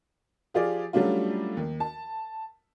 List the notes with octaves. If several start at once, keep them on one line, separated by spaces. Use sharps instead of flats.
F3 F4 G4 G#4 D5
F#3 G3 A3 C#4 D4 F4
D#2
A5